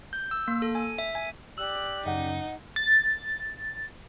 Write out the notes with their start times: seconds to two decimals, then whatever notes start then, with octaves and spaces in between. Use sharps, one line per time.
0.13 G6
0.31 E6
0.48 A#3
0.62 A4
0.75 G#5
0.98 E5
1.15 G#5
1.58 G4 D5 E6 F#6
2.06 F#2 C#3 F#3 D#4 D#5 F#5
2.76 A6